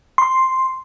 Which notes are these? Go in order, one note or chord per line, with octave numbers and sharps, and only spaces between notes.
C6